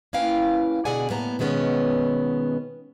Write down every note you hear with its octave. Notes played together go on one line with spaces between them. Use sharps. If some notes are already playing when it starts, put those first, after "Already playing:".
A#3 C#4 E4 B4 F5 G5
B2 D3 G#4 D5 F#5 G#5
A2 A#3 B3 A5 A#5
B2 D#3 G#3 B3 C#4